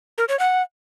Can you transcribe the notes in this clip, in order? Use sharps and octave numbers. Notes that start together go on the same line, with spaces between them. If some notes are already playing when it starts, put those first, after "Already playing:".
A#4
C#5
F#5